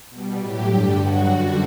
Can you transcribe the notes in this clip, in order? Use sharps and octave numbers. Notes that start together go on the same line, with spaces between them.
B2 G3
A2 F#3 G4
G2 D3 G3
G2 F#3 F#4
F#2 D3 G3